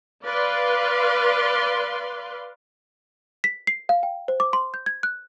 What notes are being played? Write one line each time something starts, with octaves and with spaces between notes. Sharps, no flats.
B4 D5 F5 C6
B6
C7
F5
G5
C5
D6
C6
G6
G#6
F#6